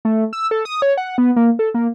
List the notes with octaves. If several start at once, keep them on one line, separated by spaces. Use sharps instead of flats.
A3
E6
A4
D#6
C#5
F#5
B3
A#3
A4
A#3